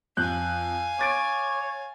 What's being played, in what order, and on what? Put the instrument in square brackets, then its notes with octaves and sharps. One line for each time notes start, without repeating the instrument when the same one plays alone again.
[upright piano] F2 F#6 G6 [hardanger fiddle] F5 G#5
[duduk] C#5 [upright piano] D6 A6 D7